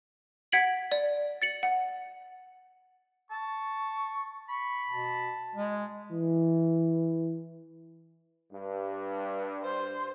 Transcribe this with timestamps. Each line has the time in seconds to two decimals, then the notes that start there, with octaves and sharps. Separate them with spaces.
0.52 F#5 G#6 B6 D7 F#7
0.92 D5
1.42 A6 C#7 F#7
1.63 F#5
3.31 A5 C#6
4.49 B5 C#6
4.90 B2 A5
5.55 G#3
6.12 E3
8.51 G2
9.63 C5 C6